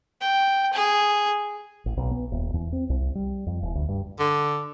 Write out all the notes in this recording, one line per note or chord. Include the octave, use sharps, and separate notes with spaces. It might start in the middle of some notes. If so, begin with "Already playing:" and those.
G5
G#4
A1
B1
B3
D#1
E2
C4
C2
G3
F2
E1
D2
G2
D3